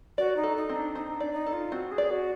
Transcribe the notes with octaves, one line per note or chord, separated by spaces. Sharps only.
F#4 D5
D#4
A4
D#4
C4
D4
C4 D#4
D4
D5
D#4
A4
F4
C4 F#4
G#4
D5
F#4